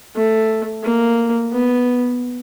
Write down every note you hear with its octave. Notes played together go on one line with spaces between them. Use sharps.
A3
A#3
B3